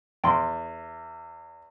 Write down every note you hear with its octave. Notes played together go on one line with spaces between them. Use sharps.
E2 G5 C6